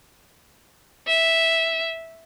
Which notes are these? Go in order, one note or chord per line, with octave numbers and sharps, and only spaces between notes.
E5